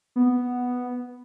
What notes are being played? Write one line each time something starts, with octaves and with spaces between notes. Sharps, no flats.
B3